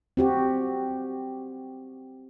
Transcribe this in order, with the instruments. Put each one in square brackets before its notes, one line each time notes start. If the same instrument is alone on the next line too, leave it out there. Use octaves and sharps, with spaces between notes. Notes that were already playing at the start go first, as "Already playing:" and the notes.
[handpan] C4 F#4 G4